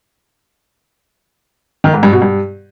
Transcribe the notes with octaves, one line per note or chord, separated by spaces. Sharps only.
D#3
G#2
G2
B2
G2